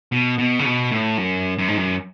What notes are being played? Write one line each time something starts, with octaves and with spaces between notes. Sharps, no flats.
B2
B2
C#3
B2
A2
F#2
F#2
G#2
F#2